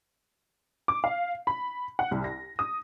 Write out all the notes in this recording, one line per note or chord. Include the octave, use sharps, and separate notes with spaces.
D6
F5
B5
F#5
C2
A#6
D#6